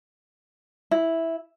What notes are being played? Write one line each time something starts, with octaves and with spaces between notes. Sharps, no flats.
E4